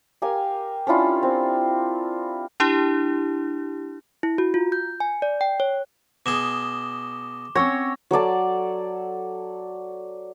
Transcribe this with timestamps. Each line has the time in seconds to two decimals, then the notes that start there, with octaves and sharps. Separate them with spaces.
0.22 G4 A#4 F5 G#5
0.87 C#4 D4 E4 F4
1.23 C4
2.60 D4 E4 G4
4.23 E4
4.38 F#4
4.54 F4
4.72 G6
5.00 G#5
5.22 D5
5.41 G5
5.60 C#5
6.26 B2 G#4 D6 E7 G7
7.55 C4 C#4 C#5 F#5 C#6 E6 A#6
8.11 F#3 A4 D5 A5